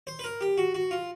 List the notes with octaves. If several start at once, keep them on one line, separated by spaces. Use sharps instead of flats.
C5
B4
A#4
G4
F#4
F#4
F4